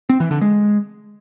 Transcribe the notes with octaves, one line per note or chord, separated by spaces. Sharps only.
C4
E3
D3
G#3